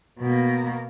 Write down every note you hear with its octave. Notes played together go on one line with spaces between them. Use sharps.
B2 A#3